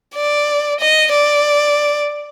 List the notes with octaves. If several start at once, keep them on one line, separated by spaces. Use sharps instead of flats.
D5
D#5
D5